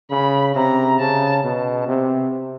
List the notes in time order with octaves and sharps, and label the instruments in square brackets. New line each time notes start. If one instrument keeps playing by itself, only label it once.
[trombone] C#3 [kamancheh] B5
[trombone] C3 [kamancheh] A#5
[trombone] C#3 [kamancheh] A5
[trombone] B2
C3